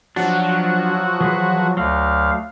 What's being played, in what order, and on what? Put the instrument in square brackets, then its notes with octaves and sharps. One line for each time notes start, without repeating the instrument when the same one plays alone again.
[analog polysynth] F3 F#3 [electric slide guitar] D4 F#5 [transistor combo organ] F#4
[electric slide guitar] E3 G#4 B4
[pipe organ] D2 F5 [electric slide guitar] F#3